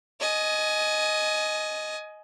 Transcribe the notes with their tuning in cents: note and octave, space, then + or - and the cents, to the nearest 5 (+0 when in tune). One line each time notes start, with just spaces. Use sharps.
D#5 +0 G#5 +20